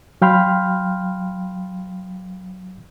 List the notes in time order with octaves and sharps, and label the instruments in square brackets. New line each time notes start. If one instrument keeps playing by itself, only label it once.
[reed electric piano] F#3 F5 G5 B5 C6 F6